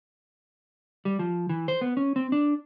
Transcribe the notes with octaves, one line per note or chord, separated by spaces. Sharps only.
G3
F3
E3
C5
B3
C#4
C4
D4